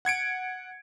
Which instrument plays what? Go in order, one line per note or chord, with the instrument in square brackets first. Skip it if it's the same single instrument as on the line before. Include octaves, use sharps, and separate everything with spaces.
[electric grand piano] F#5 G#6 C#7 D7